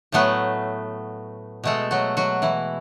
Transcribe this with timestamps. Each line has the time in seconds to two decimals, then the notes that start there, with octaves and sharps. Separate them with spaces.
0.12 A2 F#3 A3 B3 B4
1.64 B2 G#3 A3 A4
1.91 F#3 F#4
2.17 F#3 F#4
2.42 E3 E4